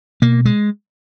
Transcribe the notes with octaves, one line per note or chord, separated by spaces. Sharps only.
B2 A#3
G#3